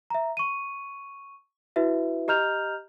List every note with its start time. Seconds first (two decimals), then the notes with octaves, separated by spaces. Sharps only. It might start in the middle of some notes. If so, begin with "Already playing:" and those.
0.10 E5 A#5
0.37 C#6 D#7
1.76 E4 F#4 B4 E5
2.28 G4 D#5 A#5 F6 G6 F7